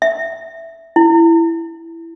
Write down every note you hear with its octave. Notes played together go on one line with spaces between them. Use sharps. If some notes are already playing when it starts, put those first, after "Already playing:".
E5
E4